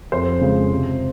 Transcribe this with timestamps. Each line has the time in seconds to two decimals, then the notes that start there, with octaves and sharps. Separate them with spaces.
0.12 F2 C5
0.41 C#3 G#3
0.70 C3